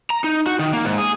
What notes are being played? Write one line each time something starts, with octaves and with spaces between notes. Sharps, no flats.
A#5
D#4
F#4
D#3
A#3
G#2
G#4